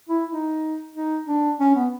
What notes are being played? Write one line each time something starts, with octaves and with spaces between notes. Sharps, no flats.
E4
D#4
D#4
D4
C#4
B3